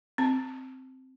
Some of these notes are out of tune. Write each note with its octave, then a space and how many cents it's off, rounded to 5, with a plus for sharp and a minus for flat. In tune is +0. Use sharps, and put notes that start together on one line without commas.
C4 +0 A5 +0